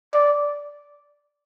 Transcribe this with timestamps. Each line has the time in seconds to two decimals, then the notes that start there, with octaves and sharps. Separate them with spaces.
0.14 D5